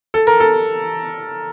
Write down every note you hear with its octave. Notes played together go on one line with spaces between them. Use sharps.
A4
A#4
A4